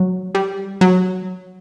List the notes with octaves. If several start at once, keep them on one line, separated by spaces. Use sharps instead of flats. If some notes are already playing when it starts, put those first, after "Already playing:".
Already playing: F#3
G3
F#3